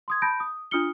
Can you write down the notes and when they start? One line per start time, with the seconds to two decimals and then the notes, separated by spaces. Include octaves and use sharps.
0.08 C6 D#6 G#6
0.22 A5 B5 G6 A#6 D7
0.40 D#6
0.71 D4 F4 D#6 F6 C#7 G7